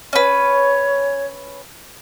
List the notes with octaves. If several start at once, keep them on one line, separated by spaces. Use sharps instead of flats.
C#4 B4 C#5